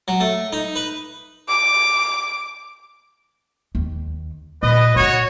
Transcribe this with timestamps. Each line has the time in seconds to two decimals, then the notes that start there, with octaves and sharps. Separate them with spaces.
0.08 F#3
0.20 A3
0.53 D#4
0.76 B4
1.48 D6
3.75 D#2
4.63 A#2 B4 D#5
4.96 A#2 D4 F#4 C#5